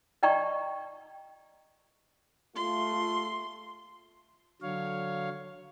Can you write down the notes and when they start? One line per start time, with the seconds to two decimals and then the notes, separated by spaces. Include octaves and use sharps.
0.23 D5 D#5 G5 A#5 C#6
2.56 A3 F4 C6
4.62 D3 F#3 C#5 F5